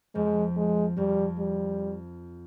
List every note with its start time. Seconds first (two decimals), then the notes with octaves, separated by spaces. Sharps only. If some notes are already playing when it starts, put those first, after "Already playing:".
0.15 F2 F3 G#3
0.57 G#3
0.97 F2 F3 G3
1.39 G3